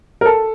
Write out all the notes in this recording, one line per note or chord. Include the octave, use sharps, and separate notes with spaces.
A#4
A4